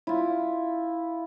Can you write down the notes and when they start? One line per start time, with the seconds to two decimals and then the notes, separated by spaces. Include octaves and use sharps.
0.07 E4 F4